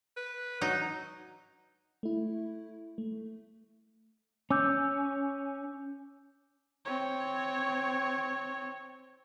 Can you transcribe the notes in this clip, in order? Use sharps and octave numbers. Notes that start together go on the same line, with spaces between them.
B4
F#3 D#4
A3 E4
A3
C#4 D6 E6 G6
C4 C#5